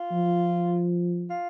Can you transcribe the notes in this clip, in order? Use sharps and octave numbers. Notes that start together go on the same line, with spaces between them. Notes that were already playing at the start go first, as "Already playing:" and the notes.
Already playing: F4
F3
F4